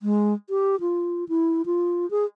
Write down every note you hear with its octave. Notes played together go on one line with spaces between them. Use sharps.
G#3
G4
F4
E4
F4
G#4